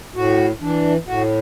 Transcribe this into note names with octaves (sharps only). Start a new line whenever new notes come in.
A2 F#4
E3 D4
A2 F#4